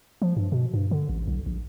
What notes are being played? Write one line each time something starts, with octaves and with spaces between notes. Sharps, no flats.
F3
G2
B2
G2
D3
A1
B1
A#1